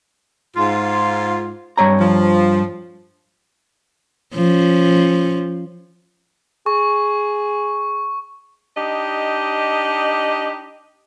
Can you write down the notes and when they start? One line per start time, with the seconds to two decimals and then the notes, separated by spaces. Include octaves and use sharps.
0.56 G#2 F4
1.78 G2 C#5 A#5
2.00 F3
4.34 F3 C#4
6.66 G#4 C#6
8.76 D4 D#4 G4 D#5